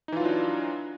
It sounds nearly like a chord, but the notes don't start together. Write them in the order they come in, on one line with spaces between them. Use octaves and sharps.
D#4 E3 F4 F#3 D4